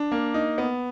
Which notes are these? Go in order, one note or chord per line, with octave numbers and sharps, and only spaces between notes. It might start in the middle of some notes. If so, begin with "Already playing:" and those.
Already playing: D4
A#3
D#4
B3